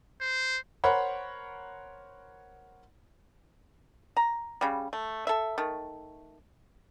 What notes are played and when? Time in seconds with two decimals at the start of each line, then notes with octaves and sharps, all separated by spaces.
0.21 C5
0.84 A#4 C5 C#5 F#5 B5
4.17 A#5
4.61 C#3 G3
4.93 A3
5.27 A4 E5
5.58 D#3 A3